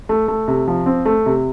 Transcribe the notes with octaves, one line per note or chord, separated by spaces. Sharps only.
A3
A3
C3
F3
C4
A3
C3